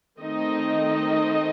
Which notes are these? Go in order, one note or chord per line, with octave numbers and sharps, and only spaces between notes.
D#3 A3 C4 D#4 D#5